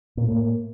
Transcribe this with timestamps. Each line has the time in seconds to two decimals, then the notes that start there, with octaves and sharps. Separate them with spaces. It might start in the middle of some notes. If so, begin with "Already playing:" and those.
0.17 A#2
0.28 A2 A#3